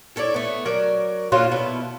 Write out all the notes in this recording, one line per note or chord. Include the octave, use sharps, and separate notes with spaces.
E4 A4 C#5 D5
A3 B3
F#3 A#4 D5
A#2 D3 F#3 F4
B2 B3 E4 A4